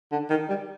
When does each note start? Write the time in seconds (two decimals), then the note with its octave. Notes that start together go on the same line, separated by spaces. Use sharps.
0.12 D3
0.30 D#3
0.49 G3